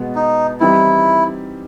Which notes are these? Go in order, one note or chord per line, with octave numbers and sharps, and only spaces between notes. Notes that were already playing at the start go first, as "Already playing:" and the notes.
Already playing: B2 G#3 B3
D#4
E3 G3 C4 D#4 E4 G4